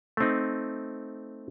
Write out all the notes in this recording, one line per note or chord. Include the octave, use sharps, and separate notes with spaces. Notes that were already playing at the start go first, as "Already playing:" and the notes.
A3 C4 D#4